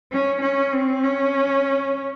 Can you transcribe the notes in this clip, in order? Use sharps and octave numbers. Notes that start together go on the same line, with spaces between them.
C#4
C#4
C4
C#4